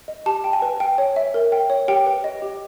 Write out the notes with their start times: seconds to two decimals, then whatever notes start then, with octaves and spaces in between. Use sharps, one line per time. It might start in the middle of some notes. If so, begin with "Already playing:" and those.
0.08 D#5
0.26 G4 A5
0.44 G5
0.53 G#5
0.62 B4
0.80 G5
0.98 C#5
1.16 E5
1.34 A#4
1.52 G5
1.70 C#5
1.88 G4 G5
2.06 B4
2.24 D#5
2.42 G4